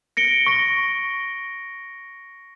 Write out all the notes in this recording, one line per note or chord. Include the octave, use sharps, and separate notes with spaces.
A#6 C#7 D7 G7
C#6 A#6